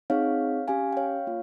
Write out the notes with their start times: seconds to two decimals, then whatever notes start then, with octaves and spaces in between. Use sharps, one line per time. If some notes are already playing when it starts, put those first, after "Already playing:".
0.10 C4 D#4 G#4 C#5 F5
0.68 C#4 G4 F5 G#5
0.93 G5
0.97 C#5 F5
1.27 A#3 F4